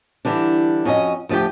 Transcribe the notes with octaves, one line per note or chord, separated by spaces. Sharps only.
D3 E3 G3 D4
F2 C#4 F#4 G#4 D#5
D2 F3 A3 G4 G5